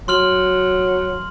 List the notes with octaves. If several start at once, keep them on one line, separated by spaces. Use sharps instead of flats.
F#3 C6 F6 F#7